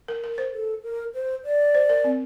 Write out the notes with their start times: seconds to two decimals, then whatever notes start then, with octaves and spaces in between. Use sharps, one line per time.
0.08 A#4
0.24 A#4
0.38 C5
0.53 A4
0.83 A#4
1.14 C5
1.44 D5
1.75 C5
1.89 A#4
2.04 C4